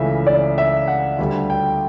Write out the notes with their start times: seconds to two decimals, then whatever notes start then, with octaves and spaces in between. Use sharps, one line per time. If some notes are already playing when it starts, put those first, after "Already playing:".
Already playing: C#2 C#3 E3 A3 E5
0.27 D5
0.58 E5
0.87 F#5
1.19 D2 D3 G3
1.50 G5